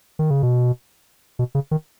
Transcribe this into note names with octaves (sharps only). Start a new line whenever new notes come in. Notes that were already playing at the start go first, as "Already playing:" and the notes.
D#3
C#3
B2
B2
C#3
D#3